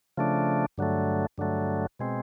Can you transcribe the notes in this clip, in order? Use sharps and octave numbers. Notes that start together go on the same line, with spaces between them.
C#3 F3 A3 D4
G2 D3 F#3 A3
G2 D3 F#3 A3
B2 G#3 C4